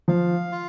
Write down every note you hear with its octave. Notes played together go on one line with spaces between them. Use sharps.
F3 F5
F4